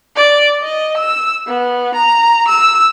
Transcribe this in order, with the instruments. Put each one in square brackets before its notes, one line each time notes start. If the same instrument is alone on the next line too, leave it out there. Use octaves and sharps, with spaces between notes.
[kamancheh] D5
D#5
E6
B3
A#5
E6